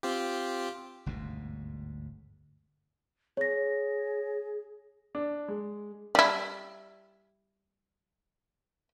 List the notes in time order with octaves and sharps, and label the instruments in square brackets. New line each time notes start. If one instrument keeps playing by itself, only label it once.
[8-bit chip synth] C4 F4 G4
[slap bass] G1 D2 G#2 B2
[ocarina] G#4 [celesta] C#5 A#6
[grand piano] D4
G#3
[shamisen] G3 E4